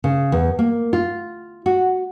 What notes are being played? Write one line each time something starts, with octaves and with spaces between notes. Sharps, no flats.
C#3
E2
A#3
F4
F#4